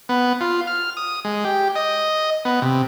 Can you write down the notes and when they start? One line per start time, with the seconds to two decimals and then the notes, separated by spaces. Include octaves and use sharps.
0.09 B3
0.41 F4
0.67 F6
0.97 D#6
1.25 G#3
1.45 G4
1.76 D#5
2.45 B3
2.62 C3